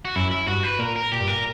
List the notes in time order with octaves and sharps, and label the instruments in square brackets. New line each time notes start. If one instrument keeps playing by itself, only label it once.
[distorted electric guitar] F#4
[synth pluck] F#2 [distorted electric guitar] E4
[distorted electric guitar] E4
[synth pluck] G2 [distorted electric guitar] F#4
[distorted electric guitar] B4
[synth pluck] A#2 [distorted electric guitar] A#4
[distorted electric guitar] A#4
[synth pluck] A#2 [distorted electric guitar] G4
[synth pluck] G2
[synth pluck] A#2 [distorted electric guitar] A#4